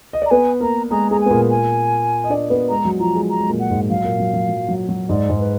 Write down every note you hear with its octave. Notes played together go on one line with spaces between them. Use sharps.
D#5
D5
A#5
B3 B4 G#5
A#3 A#4 A#5
G#3 G#4 A#5
G#3 G#4 A#5
G#5
B3
A#2 A#3
G#5
D#5
D4 D5
B3 B4
G#3 G#4 A#5
F#3 F#4
F3 F4 A#5
G#3 G#4
A#5
G#3
A#2 A#3
F#5
G#2 G#3
F#3 F5
A#2 A#3
F#3
F#3
F#3
F#3
F#3
G#2 G#3 D5
G#2 G#3
B4